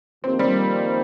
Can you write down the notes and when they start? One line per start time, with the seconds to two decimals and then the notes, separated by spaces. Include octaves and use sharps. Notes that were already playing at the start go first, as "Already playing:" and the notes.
0.24 F2 D#3 A#3 C4 D#4 G4
0.39 G3 C4